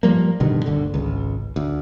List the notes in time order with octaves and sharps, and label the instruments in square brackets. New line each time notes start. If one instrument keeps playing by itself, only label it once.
[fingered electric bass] F3 G3 A#3
G2 B2 D3 D#3
G1 D2 D3
G#1 C#2
D2